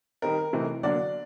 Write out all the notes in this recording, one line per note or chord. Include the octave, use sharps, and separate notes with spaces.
D#3 G3 C4 D#4 A#4
C3 E3 A3 C4 D#4
D3 F#3 A#3 D4 D5